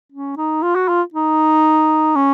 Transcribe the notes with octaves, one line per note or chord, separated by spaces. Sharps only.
C#4
D#4
F4
F#4
F4
D#4
C#4